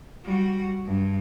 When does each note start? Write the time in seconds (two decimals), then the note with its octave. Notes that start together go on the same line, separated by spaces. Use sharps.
0.24 G3 F#4
0.86 G2